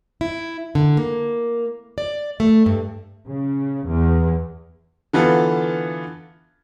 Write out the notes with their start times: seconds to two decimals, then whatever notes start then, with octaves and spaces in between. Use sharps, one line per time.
0.21 E4
0.75 D3
0.97 A#3
1.98 D5
2.40 A3
2.66 G2
3.27 C#3
3.87 E2
5.13 D3 E3 B3 F4 A4